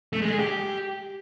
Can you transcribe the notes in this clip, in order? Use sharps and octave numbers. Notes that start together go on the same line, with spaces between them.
A3
G#3
G#4
G4